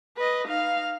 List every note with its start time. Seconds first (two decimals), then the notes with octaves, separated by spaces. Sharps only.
0.17 B4 D#5
0.48 D#4 F5